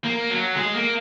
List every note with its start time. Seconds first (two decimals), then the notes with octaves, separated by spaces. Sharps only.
0.04 A#3
0.30 F#3
0.56 G#3
0.74 A#3